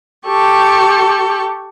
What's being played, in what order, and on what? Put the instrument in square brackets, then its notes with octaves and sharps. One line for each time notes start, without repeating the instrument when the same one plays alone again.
[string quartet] G4 A4 C#6